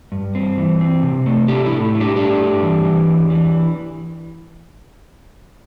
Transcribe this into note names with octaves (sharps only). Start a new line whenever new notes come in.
G2
C4
E3
C4
C3
A3
A3 D4 G4
E4
A2
A3
D4 G4
A3 D4 G4
G2
E3
E3
E2
E3